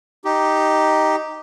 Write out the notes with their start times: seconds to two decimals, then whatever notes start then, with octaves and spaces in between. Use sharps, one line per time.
0.25 D#4 G4